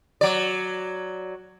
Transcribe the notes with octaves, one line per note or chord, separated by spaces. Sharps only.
F#3 D5